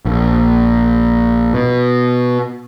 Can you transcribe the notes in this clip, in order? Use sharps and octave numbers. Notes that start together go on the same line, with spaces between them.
A#1
B2